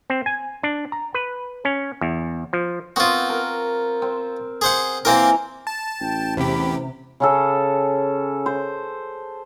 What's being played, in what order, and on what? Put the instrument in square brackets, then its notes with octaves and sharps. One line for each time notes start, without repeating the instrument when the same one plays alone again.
[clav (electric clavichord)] C4
G#5
D4
A#5
B4
C#4
E2
F3
[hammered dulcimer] B3 C4 [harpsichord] F4 F#4
[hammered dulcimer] A#4
C4
[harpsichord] G#4 C5 F#5
[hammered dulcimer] E3 G#5 A#5 [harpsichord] A#3 C4 A#4
[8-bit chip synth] A5
[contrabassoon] A1 [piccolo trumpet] G5
[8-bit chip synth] E2 G4 [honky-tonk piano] C3 [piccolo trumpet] B5
[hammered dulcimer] C#3 C#4 A4
C5